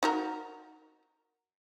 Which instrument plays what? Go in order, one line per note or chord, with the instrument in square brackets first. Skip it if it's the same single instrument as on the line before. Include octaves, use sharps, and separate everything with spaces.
[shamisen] D#4 F#4 A#4